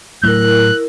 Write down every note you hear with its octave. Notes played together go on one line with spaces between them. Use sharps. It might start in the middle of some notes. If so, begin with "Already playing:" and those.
A2 F#3 A3 E4 A#4 F#6